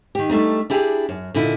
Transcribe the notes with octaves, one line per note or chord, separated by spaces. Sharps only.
D#3 G4
G3 A3 D4 D#4
D4 E4 G4 G#4
F#2
A#2 D3 D#4 E4